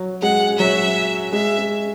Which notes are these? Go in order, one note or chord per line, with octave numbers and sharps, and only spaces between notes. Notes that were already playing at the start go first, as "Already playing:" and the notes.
Already playing: F#3
G#3 F#5
F#3 E5
G#3 E5
G#3